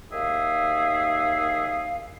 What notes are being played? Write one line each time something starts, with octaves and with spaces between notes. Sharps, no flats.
D#2 D#3 G#4 E5 F5